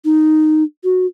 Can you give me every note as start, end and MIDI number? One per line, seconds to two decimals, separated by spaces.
0.05 0.63 63
0.84 1.06 66